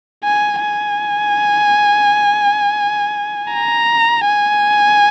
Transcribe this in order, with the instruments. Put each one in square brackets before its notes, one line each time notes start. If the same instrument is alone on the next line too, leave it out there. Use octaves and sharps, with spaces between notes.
[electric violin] G#5
G#5
A#5
G#5